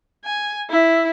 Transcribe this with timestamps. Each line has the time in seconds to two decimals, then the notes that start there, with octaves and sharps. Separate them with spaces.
0.25 G#5
0.70 E4